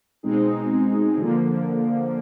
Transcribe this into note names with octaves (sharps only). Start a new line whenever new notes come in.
B2 G#3 C4 D#4 G#4
D3 F3 A#3